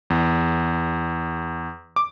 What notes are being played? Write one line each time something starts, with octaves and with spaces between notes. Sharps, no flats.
E2
D6